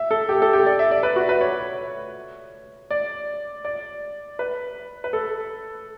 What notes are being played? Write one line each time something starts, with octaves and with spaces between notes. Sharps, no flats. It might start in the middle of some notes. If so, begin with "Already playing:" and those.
Already playing: E5
A4
G4
A4
G4
D5
E5
D5
B4
F#4
B4
C#5
D5
D5
B4
B4
A4